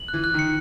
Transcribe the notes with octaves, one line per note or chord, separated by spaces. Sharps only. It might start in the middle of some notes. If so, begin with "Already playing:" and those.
Already playing: F#7
E3 F#6
F#6
D#3 C#7